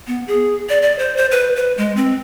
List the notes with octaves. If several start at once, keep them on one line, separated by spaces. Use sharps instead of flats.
B3
G#4
D5
D5
C5
C5
B4
B4
G#3
C4